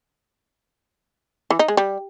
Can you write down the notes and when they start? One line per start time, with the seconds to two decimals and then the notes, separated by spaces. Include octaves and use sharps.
1.50 E3
1.59 D#4
1.68 G#3
1.77 G3